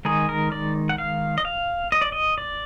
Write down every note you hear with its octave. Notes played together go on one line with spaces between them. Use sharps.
D#3 G#3 D#4 G#4
A#4
D5
F#5
F5
D#5
F5
D#5
D5
D#5
D5